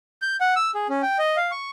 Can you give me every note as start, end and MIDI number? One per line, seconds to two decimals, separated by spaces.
0.22 0.36 91
0.41 0.55 78
0.56 0.71 88
0.75 0.87 68
0.89 1.02 61
1.02 1.18 79
1.19 1.36 75
1.37 1.51 77
1.51 1.71 85